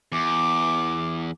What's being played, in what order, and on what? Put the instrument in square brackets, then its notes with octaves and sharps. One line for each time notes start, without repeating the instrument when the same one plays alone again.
[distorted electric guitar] E2 [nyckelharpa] D6